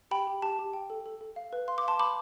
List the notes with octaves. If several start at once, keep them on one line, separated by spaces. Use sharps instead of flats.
G4 G5 B5
G4
G4 A5
G4
G5
A4
A4
A4
F5
B4
F5 C6
D6
F5 A5 C6
B4 B5 D6